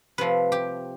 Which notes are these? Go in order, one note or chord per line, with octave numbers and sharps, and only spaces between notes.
C3 F3 A3 B4
G4